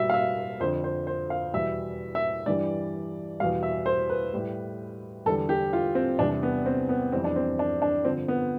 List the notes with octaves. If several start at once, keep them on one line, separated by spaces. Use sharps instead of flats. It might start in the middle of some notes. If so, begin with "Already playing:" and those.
Already playing: B2 G3 E5
F5
E5
F2 D3 F3 C5
C5
C5
F5
E2 B2 G3 E5
E5
G2 E3 G3 D5
E2 B2 G3 F5
E5
C5
B4
A2 G3
E2 D3 G3 A4
G4
F4
C4
E2 C3 G3 D4
B3
C4
B3
F2 E3 G3 C4
D4
C4
D4
D4
G2 D3 F3 C4
B3